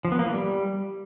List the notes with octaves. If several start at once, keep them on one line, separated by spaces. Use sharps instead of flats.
F3
B3
A#3
E3
G3